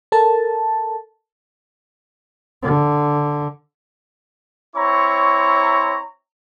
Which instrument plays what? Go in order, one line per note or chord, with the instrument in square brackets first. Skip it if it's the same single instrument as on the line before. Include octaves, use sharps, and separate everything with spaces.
[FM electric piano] A4 A#4 A5
[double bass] D3
[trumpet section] C4 E4 C#5 A#5 C6 C#6